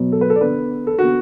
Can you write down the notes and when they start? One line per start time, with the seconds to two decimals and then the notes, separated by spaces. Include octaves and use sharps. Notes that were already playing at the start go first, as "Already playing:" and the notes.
Already playing: B2 F#3 B3
0.12 A4
0.21 B4
0.30 A4
0.36 D5
0.41 D3 B3 B4
0.87 A4
0.98 D3 B3 F#4